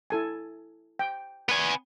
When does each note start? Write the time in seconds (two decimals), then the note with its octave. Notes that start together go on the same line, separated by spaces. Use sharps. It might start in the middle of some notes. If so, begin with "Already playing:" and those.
0.10 E4 A4 G#5
0.99 G5
1.49 B3 G#5